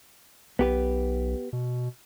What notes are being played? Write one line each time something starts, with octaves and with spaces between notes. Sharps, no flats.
B1 B3 G4 B4
B2